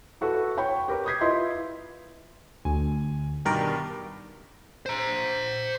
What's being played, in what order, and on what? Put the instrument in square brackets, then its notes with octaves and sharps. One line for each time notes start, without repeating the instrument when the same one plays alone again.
[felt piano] E4 F#4 A4 B4
C#5 G5 B5 C#6
G4 A#4 B4
D6 D#6 G6 G#6 B6 C7
E4 F4 B4 D#5 C6
[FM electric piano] D2 [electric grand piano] G#5
[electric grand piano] G2 B2 D#3 [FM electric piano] G4 A#4 D5
[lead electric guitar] C5 A#5